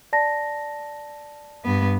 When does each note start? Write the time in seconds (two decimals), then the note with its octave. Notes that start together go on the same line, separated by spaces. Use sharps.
0.13 D5 A5 A#6
1.65 G2 B3